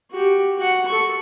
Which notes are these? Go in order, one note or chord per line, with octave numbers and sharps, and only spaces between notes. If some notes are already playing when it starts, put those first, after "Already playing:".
F#4 G4
F#4 F#5
A4 C#6